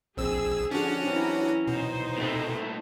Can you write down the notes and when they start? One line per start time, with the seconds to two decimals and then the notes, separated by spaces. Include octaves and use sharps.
0.17 A#1 C4 G#4 E6
0.71 D3 F3 C#4 D4 F#4
1.07 E3 F#3 C4 E4 A#5
1.67 B2 D#4 C5
2.18 A#2 A3 B3 C4 F#4